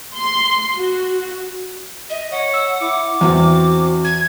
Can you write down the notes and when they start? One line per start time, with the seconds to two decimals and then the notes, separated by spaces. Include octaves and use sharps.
0.16 C6
0.76 F#4
2.10 D#5 E5
2.31 C#5 F#5
2.53 E6
2.81 E4 D6
3.21 E2 C4 F#4
4.05 G#6